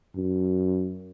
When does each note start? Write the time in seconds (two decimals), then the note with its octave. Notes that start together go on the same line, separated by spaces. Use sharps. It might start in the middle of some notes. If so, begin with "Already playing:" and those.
0.16 F#2